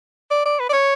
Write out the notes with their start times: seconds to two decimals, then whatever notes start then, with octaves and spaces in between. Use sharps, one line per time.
0.31 D5
0.45 D5
0.60 B4
0.69 D5
0.73 C#5